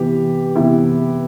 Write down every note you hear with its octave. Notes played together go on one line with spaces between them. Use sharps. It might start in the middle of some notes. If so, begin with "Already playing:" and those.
Already playing: C3 E3 B3 G4
C3 E3 B3 E4